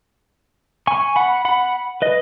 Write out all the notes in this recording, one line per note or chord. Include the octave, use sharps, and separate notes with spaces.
G#5 C#6
F#5 B5
F#5 B5
B4 D#5